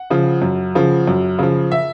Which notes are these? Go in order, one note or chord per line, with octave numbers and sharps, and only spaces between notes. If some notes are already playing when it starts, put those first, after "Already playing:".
Already playing: F#5
C#3 F3
F#2
C#3 F3
F#2
C#3 F3
E5